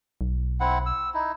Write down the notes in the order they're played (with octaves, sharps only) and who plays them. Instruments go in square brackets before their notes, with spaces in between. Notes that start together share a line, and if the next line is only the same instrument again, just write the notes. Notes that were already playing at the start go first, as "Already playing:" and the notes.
[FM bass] B1
[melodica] C4 E4 F#5
E6
D#4 E4